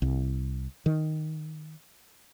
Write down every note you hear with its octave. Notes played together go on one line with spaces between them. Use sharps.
C2
D#3